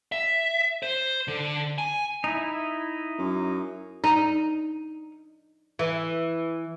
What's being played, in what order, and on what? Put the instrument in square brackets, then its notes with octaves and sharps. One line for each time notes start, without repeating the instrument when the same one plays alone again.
[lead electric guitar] E5
C5
D3
G#5
[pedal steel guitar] D#4 E4
[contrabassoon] F#2
[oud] D#4
E3